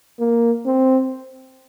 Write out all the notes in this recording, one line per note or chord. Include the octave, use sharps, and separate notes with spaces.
A#3
C4